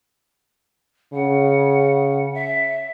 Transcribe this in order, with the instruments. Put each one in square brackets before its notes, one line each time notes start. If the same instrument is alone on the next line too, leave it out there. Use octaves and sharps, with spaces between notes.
[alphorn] C#3 [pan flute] F#5
[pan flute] E5